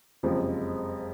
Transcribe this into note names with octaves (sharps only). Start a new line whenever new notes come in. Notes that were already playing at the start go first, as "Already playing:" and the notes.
F#1 F2 C3 F3 G#3